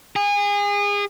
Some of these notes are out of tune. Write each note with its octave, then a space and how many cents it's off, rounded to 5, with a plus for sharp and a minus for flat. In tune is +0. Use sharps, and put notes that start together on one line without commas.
G#4 -30